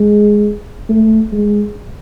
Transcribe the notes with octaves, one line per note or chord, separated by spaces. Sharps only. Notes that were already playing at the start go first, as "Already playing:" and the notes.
Already playing: G#3
A3
G#3